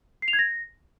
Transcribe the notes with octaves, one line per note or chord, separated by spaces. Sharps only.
C7
F7
G#6
A#6